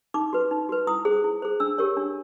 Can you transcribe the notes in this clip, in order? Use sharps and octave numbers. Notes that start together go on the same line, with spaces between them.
D#4 D6
F#4 B4
D#4
F#4 B4
E4 D#6
G#4 C5
E4
G#4 C5
D4 E6
G4 A#4 C#5
D4